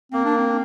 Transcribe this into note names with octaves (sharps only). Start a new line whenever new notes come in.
A#3 C4
D4
C4